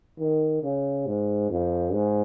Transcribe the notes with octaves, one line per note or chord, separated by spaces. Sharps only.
D#3
C#3
G#2
F2
G#2